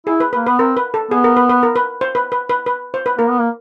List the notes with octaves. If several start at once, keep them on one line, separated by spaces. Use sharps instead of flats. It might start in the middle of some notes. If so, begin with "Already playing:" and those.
E4 G#4
B4
B4
A#3
B3 B4
C4 A#4
B4
A4
B3 G#4
A#4
B4
B4
A#4
B4
C5
B4
B4
B4
B4
C5
B4
A#3 A#4
B3
A#3